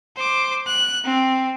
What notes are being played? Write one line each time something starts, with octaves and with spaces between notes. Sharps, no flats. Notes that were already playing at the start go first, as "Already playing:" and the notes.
C5 D6
F#6
C4